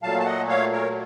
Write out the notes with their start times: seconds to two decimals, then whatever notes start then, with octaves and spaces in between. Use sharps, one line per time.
0.02 A#2 F#3 A3 F5 A5
0.19 A5
0.25 D#5 F#5
0.49 C#5 F5
0.72 A#4 C#5